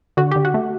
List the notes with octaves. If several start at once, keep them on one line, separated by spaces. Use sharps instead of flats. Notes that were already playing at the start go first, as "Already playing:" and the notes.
D3 F#4
D3 G4
F#4
A3